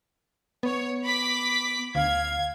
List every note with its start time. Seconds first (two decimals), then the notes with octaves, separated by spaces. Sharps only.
0.63 B3 C#5
1.04 B5 D6 B6
1.95 D2 F5 G#6